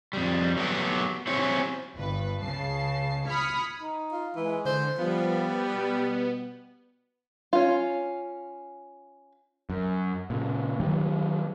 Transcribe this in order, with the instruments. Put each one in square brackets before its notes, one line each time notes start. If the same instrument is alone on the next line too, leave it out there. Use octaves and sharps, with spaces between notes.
[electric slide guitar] F2 G3
F#3 A3 B3 G4
F#3 C4 C#4 E4 G4 C#5
[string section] G1 G2 B4
C#2 C#3 A5 C7
B5 D#6 F6 G#6 B6 C#7
[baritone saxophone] D#4
[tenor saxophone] F4
[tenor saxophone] E3 [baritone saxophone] G#3
[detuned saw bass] D3 [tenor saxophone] C5
[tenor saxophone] F3 [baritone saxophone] G3 [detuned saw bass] B3
[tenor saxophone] B2
[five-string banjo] C#4 F4
[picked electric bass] F#2
A#2 C#3
D#3 F#3 G3